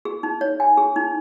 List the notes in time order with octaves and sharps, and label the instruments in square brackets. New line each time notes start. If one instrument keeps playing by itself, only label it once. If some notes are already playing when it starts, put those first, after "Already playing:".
[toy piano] G#4
D#4
C#5
G#5
G#4
D#4